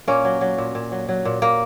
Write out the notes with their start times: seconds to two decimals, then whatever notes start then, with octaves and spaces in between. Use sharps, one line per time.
0.07 A#2 A#3 C#4
0.25 F#3
0.41 F#3
0.58 A#2
0.75 A#2
0.92 F#3
1.08 F#3
1.25 A#2
1.42 A#2 A#3